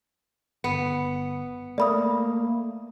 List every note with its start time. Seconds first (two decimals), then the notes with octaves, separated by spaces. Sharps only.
0.64 G1 B3 C#7
1.78 A3 A#3 D5 B5 D#6